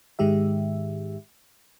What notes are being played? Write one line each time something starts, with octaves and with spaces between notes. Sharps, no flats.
G#2 D#3 G#3 G4 E5